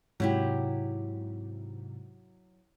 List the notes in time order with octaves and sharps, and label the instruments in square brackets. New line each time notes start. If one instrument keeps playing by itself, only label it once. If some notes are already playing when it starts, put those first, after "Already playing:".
[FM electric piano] G#2 C3 [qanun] F#3 E4 G4